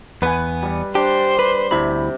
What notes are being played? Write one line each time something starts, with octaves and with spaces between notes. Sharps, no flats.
E2 B3 B4 G#5
G3
D4 G4 C5
B4
D2 C3 E4 B5